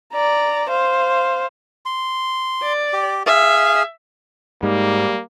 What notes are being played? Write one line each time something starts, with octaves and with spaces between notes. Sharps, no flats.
D5 A#5
C5 F5
C6
D5
G4
G#4 E5 F5
G#2 G3 A#3